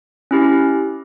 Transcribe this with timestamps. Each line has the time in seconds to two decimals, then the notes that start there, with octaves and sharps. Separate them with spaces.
0.31 C#4 E4 G4